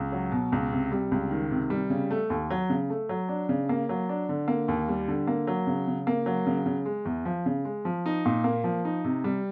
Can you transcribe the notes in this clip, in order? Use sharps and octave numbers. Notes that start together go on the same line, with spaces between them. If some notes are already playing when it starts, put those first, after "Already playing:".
Already playing: C#2
F#3
B2
C#2
C3
G3
C#2
D#3
C3
G3
C#3
A3
D#2
F#3
C#3
A3
F#3
D4
C#3
A#3
F#3
D4
D3
A#3
D#2
G3
D3
A#3
F#3
C#3
C#3
A#3
F#3
C#3
C#3
G#3
E2
F3
C#3
G#3
F3
D#4
A#2
A#3
F3
D#4
C3
G3